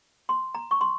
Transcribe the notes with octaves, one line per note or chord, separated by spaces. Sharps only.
C6
A#5
C#6
C6